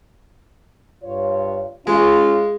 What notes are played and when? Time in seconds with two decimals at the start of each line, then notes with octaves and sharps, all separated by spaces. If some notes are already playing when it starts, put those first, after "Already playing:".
1.04 G2 F4 C#5
1.87 G#3 C#4 F4